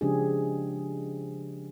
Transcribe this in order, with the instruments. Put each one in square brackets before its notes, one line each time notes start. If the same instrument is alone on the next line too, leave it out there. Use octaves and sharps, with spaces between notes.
[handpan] C#3 F3 G#3 D4 G4 G#4